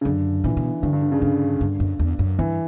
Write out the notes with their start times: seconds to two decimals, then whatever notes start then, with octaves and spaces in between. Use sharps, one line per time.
0.01 C#3
0.05 F#2 D3
0.44 A#2 E3
0.57 B2
0.82 G2 D3
0.93 G2
1.02 D3
1.12 C#3
1.22 G2 D3
1.61 G2
1.80 F#2
1.99 E2
2.19 F#2
2.39 G2 E3